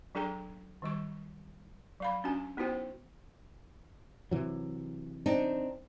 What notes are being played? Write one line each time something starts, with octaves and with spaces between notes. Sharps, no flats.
F#3 D4 G#4 A4 G5 A#5
D#3 G3 C#6
F#3 F5 B5
C#4 D4 F#4 G#5
B3 D#4 E4 F#4 C5 G5
C3 E3 F#3
C4 D4 D#4